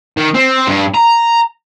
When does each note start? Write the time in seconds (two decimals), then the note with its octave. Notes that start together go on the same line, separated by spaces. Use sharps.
0.17 D#3
0.34 C4
0.67 G2
0.94 A#5